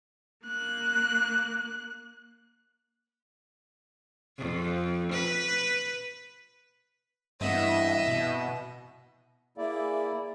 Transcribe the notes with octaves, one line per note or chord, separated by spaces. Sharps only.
A#3 F#6
F2
B4
G2 E3 B3 C4 D#5 E5
B2
A#3 E4 G#4 D5 E5